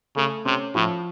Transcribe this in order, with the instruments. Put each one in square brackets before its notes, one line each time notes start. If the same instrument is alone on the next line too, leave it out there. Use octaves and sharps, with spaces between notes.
[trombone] C#3 [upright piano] A3
[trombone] C3 [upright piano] C#4
[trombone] A2 [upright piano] F3